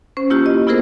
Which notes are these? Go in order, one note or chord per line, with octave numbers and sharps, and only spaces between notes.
C#4 C5
A#3 E4 F4 G4
D#5
B3 E4 F4 G#4 A#4 C5